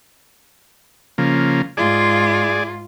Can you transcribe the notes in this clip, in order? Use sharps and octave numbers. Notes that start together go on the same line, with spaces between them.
C#3 F3 A#3
G#2 F4 G#4 D5